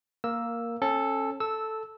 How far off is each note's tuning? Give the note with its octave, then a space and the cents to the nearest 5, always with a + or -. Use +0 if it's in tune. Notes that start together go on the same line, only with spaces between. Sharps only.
A#3 +0 A#4 +5 E6 +0
C#4 -30 A4 +0
A4 +0 E6 -10